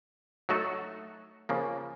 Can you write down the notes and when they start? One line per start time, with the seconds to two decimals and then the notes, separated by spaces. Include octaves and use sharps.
0.49 F#3 A3 D#4 F#4 A4
1.49 C#3 F3 A#3